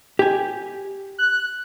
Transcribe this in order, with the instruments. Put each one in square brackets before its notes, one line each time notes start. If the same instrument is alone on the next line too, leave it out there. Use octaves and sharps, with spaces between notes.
[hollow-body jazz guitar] G4 G#5
[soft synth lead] F#6